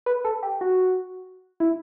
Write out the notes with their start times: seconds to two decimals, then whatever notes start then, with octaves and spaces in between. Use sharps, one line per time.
0.06 B4
0.25 A4
0.43 G4
0.61 F#4
1.60 E4